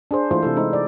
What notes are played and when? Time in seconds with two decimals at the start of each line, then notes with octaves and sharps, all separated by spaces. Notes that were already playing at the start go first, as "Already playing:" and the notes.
0.11 D4 G#4 C5
0.31 E3 G#3 A3 E4 F4 C5
0.43 C3 E4 A4
0.57 G#3 D#4 C5
0.73 D5